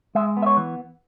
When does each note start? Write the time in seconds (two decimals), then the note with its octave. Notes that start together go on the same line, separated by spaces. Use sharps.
0.15 G#3 E5
0.37 B3
0.42 E5
0.46 C#5
0.57 E3